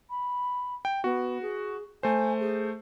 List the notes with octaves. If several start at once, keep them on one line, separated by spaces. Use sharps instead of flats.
B5
G5
B3 F#4
G#4
A3 C5 G#5
G#4